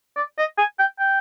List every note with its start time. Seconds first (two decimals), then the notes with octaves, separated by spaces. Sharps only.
0.16 D5
0.38 D#5
0.58 G#5
0.79 G5
0.99 G5